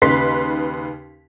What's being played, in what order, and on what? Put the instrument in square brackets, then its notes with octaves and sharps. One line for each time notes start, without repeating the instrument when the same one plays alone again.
[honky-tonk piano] D#2 C#3 D#4 B4 C6 B6